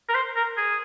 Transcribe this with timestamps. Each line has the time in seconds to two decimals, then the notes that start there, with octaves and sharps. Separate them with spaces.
0.09 A#4
0.15 C5
0.36 A#4
0.57 G#4